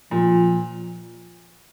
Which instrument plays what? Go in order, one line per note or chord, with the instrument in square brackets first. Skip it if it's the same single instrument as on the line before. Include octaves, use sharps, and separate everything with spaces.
[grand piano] A#2 [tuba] F3